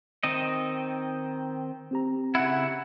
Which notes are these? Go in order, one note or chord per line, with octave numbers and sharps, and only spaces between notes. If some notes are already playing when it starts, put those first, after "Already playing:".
D#3 C4 D#5
C4 G4 A#5
C#3 E4 F#5